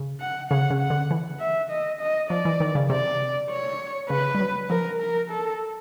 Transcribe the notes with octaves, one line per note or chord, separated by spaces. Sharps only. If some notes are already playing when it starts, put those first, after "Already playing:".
Already playing: C#3
F#5
C#3 F#5
C#3
F#5
D3
E3
E5
D#5
D#5
F3 D5
E3
D#3
C#3
C3 D5
C#5
C#3 B4
G3
F#3
F3 A#4
A#4
A4